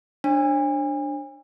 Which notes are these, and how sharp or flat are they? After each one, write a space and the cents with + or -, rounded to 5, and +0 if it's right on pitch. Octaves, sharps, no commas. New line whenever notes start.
D4 +0 C#5 -45 G#5 -40